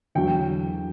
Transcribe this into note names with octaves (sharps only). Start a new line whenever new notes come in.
E2 D3 F#3 G5